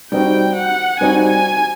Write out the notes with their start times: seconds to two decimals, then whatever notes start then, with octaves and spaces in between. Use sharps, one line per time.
0.12 G3 C4 D#4 F#4 G5
0.56 F#5
1.00 G3 C4 D#4 F#4 G#5
1.29 G#5